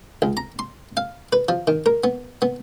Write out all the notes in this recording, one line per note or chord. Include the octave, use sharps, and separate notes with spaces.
C#2
A#5
C6
F5
B4
F3
D#3
A#4
B3
B3